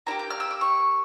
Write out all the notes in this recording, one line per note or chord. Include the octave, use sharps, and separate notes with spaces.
A#3 E4 G4 A#5
G6
F6
E6
D6
C#6